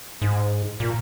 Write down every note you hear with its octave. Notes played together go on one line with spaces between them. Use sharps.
G#2
A#2